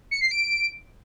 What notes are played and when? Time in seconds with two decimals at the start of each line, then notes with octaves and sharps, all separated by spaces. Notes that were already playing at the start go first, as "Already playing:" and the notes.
0.11 C#7
0.21 C7
0.31 D7